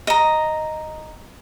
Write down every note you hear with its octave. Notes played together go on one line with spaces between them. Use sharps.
D#5 A#5